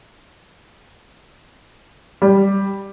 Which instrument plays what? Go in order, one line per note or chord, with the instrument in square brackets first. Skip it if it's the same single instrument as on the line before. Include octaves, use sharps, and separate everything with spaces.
[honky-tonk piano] G3